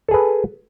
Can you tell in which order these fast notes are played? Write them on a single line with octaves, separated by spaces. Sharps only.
A4 G#4 B4